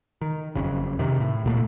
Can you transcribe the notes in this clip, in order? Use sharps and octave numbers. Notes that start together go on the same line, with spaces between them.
D#3
F#1 F2 C#3
C3 D#3
A2
D1 A#2 A3